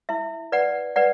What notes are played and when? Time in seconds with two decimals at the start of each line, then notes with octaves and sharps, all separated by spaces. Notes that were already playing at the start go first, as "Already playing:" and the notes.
0.09 E4 E5
0.52 B4 D5 F#5
0.96 B4 D5 F#5